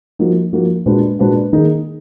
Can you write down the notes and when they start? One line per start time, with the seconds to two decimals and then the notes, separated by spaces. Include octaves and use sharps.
0.19 F3 A#3 D#4 F#4
0.53 F3 A#3 D#4 F#4
0.86 A#2 G#3 D4 F#4 B4
1.19 A#2 G#3 D4 F#4 B4
1.53 D#3 A#3 D#4 G#4